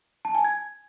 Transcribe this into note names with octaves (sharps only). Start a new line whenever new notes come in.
A5
G#5
G#6